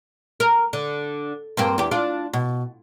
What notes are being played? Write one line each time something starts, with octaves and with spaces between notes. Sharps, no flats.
A#4
D3
G2 A#3 C4
E2 G4
D4 F4 D5
B2